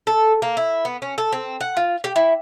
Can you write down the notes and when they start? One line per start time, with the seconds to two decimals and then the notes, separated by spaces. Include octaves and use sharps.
0.07 A4
0.42 A#3
0.57 E4
0.85 B3
1.02 C#4
1.18 A4
1.32 C4
1.60 F#5
1.77 F4
2.04 G4
2.16 E4